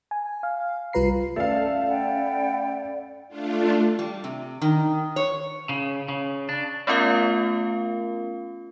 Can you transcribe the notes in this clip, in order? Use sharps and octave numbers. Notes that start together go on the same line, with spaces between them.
G#5
F5
C2 G3 F4 B4 A#5 C7
A3 C#4 A4 D5 F5
F#5 G5 B5
A3 D4 F4
G3
C3
D#3
C#5
C#3
C#3
D4
A3 B3 C#4 F4 A#4 F5